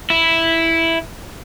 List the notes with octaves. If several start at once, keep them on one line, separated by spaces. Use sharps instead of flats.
E4